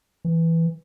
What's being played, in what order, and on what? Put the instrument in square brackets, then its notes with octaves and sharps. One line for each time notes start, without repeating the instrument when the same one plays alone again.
[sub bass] E3